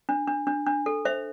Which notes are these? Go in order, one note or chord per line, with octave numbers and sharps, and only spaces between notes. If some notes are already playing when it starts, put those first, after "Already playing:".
D4
D4
D4
D4
A4
C5 E5